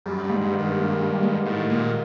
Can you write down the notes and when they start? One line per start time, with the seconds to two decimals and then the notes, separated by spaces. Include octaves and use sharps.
0.06 F#2 G3
0.24 G2
0.30 G#2
0.41 G2
0.53 D#3
0.59 G2
0.76 A#3
1.00 G3
1.22 G#2
1.46 A2 D#3
1.70 A#2 A#3